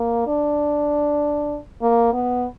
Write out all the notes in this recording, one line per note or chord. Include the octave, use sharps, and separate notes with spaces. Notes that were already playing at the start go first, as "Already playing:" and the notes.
Already playing: A#3
D4
A#3
B3